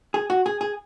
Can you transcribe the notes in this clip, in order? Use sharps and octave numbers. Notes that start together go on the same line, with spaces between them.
G#4
F#4
G#4
G#4